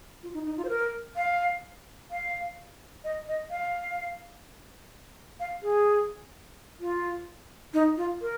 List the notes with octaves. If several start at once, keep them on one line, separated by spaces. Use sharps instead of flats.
F4
D#4
D#4
F4
C5
A#4
F5
F5
D#5
D#5
F5
F5
G#4
F4
D#4
F4
A#4